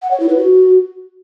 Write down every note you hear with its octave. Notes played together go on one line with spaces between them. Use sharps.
F#5
C#5
E4
B4
F#4